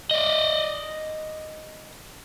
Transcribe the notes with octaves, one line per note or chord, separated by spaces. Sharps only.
D5 D#5